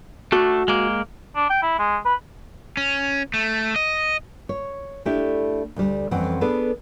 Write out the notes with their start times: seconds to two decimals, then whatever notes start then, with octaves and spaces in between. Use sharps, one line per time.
0.32 A3 D4 F#4
0.68 G#3 A#3
1.36 D4
1.50 G5
1.63 E4
1.79 G#3
2.05 B4
2.77 C#4
3.34 A3
3.76 D#5
4.49 C#5
5.05 A3 D4 E4 G4
5.76 D2 G3
6.11 F2 E3 C4 C#4 F#5
6.41 B3 D4 G#4 A4 B4